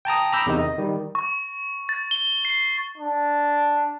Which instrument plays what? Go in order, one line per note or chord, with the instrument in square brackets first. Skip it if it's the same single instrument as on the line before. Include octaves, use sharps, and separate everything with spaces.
[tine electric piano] G5 A5 A#5 D#6
A#5 B5 D6 E6 G6
E2 C3 D#3 D#4
D#5
D#3 G3
[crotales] C#6
A6
G7
C7
[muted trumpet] D4